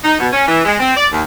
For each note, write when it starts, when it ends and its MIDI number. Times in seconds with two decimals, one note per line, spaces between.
0.04 0.16 63
0.19 0.28 47
0.33 0.44 61
0.48 0.63 52
0.65 0.75 56
0.80 0.93 60
0.97 1.07 74
1.12 1.23 39